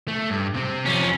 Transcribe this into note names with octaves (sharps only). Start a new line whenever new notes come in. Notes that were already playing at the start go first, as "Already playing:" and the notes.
A3
G2
C3 C4
F2 C#4